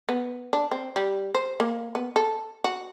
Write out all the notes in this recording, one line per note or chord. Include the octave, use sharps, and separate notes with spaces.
B3
D4
C4
G3
C5
A#3
B3
A4
F#4